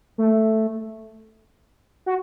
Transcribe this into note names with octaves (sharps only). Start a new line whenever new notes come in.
A3
F#4